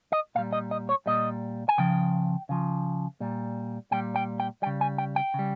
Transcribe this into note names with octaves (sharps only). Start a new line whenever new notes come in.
D#5
A#2 G3 F5
D#5
D#5
C#5
A#2 G3 D#5
G#5
C#3 F3 G5
C#3 F3
A#2 G3
A#2 G3 G5
G5
G5
C#3 G3 G5
G#5
G5
G5
C#3 G3